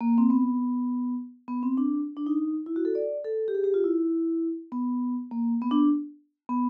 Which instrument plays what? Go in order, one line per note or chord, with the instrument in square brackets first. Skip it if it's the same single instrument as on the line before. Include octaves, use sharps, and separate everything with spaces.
[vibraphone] A#3
C4
B3
B3
C4
D4
D4
D#4
E4
F#4
A4
D5
A4
G4
G#4
G4
F4
E4
B3
A#3
B3
D4
B3